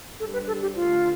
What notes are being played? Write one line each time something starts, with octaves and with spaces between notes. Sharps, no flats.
G3 D4 G4 A4 C5
B4
A4
G4
D3 A3 D4 F4 A4 C5